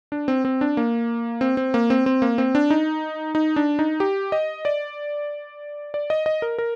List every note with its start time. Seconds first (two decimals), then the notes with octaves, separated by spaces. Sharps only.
0.12 D4
0.28 C4
0.45 C4
0.61 D4
0.77 A#3
1.41 C4
1.57 C4
1.74 A#3
1.90 C4
2.06 C4
2.22 A#3
2.38 C4
2.55 D4
2.70 D#4
3.35 D#4
3.56 D4
3.79 D#4
4.00 G4
4.32 D#5
4.65 D5
5.94 D5
6.10 D#5
6.26 D#5
6.42 A#4
6.58 A#4